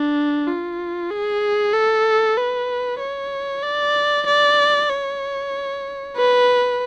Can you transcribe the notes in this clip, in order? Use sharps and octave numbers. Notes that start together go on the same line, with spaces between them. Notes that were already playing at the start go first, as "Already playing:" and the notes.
Already playing: D4
F4
G#4
A4
B4
C#5
D5
D5
C#5
B4